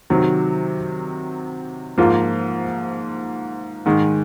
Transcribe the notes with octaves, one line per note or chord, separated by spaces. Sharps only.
C3 D#3 F#3
G#2 F3 A#3 F4
G#2 D#3 G#3